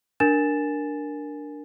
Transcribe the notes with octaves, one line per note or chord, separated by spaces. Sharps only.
D4 A#4 G#5 A6 E7